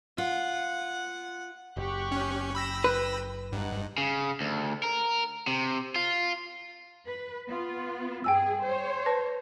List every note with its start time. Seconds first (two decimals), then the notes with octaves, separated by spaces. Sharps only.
0.18 F4 F#5
1.77 F#1 G4 C#6 F#6
2.12 C#4
2.55 G5 B5 E6 A#6
2.84 B4
3.52 G2 D#4 F#5
3.98 C#3
4.41 D2
4.84 A#4
5.47 C3
5.96 F4
7.06 B4
7.46 B3 F4
8.24 G2 G#4 G5 G#5 E6
8.61 C5 C#5
9.06 B4 A5 A#6